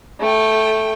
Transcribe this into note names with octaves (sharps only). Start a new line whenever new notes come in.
A3 G5